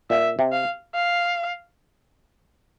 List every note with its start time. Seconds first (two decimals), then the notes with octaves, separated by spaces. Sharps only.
0.10 A#2 E5
0.39 C3
0.52 F5
0.95 F5